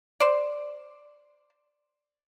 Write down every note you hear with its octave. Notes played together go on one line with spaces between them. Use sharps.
C5 D5